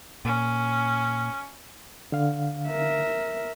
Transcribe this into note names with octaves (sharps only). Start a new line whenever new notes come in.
A#2 C#4
D3 F5
A#4 E5